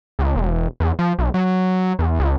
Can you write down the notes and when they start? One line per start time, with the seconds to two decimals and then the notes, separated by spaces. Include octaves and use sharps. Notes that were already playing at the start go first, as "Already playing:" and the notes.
0.19 C#2
0.36 E1
0.80 E2
0.99 F3
1.19 B1
1.34 F#3
1.99 E2
2.20 C#2